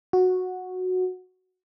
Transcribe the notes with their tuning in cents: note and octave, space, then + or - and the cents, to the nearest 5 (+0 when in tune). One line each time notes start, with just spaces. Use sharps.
F#4 -10